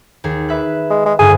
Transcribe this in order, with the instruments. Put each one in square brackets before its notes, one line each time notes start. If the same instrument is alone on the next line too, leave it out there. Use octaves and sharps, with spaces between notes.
[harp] D#2 G#4
B4 E5 F#6
[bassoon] G#3
G#3
[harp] G#1 D2 G2 [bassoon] G#4